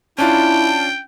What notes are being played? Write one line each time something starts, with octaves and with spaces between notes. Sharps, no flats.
C#4 D4 E4 F4 G5 A5